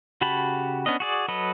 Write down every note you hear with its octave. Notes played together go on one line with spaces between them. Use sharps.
C#3 F#4 G4 A5 B5
B3 C#4 D4 D#5
F#4 G#4 D5
F#3 A4 B4 D#5